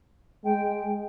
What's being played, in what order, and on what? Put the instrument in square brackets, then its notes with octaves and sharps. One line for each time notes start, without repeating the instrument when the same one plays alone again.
[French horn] G#3 [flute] G5